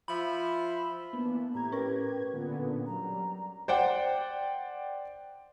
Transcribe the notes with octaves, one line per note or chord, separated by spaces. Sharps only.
F3 E5 B5
E3 A#3 B3 D4
A2 G4 A#5 G#6
C#4 A#4 B4
A#2 D3 B3
F#3 G3 A#5
C5 D5 F#5 G5